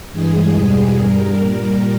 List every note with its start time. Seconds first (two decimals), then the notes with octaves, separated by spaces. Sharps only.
0.11 G2 E3 G#3 G#4
0.54 E2 B2 G3
0.97 G2 G3 A#4
1.39 A#2 G3